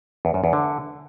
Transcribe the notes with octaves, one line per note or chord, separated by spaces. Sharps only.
E2
F#2
E2
D3